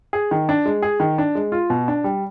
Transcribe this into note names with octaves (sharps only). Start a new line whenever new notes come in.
G#4
D#3
D4
G#3
G#4
D#3
D4
G#3
F4
B2
D4
G3